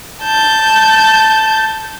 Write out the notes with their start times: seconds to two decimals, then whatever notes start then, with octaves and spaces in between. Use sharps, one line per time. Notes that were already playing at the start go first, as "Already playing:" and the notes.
0.24 A5 G6